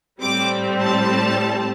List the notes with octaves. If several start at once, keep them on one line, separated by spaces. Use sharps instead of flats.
A2 G3 C4 D6
A5